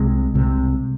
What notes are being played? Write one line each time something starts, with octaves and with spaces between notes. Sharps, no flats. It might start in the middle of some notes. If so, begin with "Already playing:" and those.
Already playing: C2 C3 G#3
C2 C3